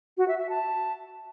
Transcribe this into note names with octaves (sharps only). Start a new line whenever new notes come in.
F#4
E5
E5
A5